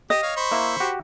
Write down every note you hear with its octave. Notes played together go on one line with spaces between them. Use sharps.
G4 D#5
C#5 F5
C5 B5 C#6
A#3 E4 E5
F#4 G4